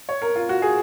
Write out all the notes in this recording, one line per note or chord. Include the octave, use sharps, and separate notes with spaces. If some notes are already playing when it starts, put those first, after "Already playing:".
C#5
A#4
F4
F#4
G#4